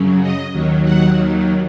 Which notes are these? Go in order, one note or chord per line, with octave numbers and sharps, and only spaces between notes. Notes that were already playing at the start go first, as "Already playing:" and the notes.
Already playing: F#2 C#3 F#3
D#5
D#2 D#3 F#3
F#5